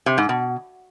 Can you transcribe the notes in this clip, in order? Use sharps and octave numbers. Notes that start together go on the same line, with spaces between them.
C3
G#2
B2